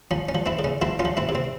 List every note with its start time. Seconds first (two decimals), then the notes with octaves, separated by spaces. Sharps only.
0.11 F3 C#4
0.29 C#4
0.35 F3
0.46 C4 E4
0.59 C#3
0.64 C#4
0.82 F3 C4 E4
0.99 C#4 F4
1.05 F3
1.17 C4 E4
1.29 C3
1.35 C4